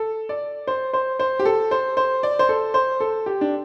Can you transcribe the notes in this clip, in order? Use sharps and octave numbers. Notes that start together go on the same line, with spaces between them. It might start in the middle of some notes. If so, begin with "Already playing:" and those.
Already playing: A4
D5
C5
C5
C5
G4
A4
C5
C5
D5
C5
A4
C5
A4
G4
D4